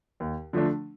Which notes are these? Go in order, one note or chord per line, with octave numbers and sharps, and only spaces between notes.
D#2
D3 F3 A3 D4